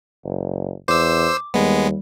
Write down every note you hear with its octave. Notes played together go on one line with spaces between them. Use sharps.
F#1
E2 C5 D6 E6
D#2 G3 G#3 B3